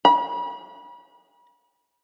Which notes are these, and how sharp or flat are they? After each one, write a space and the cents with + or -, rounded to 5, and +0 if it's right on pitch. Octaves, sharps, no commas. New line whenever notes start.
B5 -40